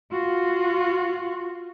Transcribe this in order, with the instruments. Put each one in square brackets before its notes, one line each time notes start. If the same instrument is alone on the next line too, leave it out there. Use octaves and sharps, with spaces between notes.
[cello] F4 F#4